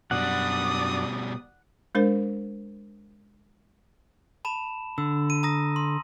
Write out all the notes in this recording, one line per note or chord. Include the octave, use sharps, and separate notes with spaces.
F#2 B2 G3 D4 D5 F#5 D#6
G#3 D4 A#4 C5
A5 B5 E7
D3 E6
D#7
A#5 D#6 A#6
C6